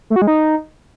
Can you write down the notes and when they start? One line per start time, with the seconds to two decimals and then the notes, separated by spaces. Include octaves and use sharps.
0.10 A3
0.16 F#4
0.22 G#3
0.27 D#4